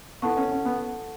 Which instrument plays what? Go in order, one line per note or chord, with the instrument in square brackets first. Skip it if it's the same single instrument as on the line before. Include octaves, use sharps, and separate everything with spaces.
[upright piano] B3 [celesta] E4 A4 F#5 A5 C#6
[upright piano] C#4
C#4
B3